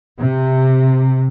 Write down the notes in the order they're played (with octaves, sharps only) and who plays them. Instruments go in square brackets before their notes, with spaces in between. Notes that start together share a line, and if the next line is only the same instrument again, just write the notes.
[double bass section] C3